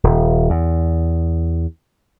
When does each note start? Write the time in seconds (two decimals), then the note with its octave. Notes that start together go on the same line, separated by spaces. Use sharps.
0.04 D#1
0.50 E2